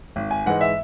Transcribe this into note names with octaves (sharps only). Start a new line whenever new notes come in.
G#1
G#5
G#2 E3 G#3 F#5
E5